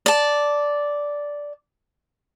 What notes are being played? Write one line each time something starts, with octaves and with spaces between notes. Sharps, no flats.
D5 A5